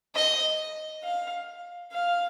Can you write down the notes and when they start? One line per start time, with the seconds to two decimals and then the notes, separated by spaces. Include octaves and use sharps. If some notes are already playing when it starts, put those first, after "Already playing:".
0.15 D#5
1.03 F5
1.92 F5